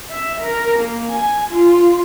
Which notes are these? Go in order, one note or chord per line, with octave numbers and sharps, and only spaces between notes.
E5
A#4
A#3
G#5
F4